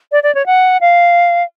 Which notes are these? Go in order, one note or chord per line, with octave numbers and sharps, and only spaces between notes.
D5
D5
C#5
F#5
F5